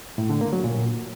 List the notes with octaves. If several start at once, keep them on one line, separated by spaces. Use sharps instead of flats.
A2
D3
A#3
F#3
A#2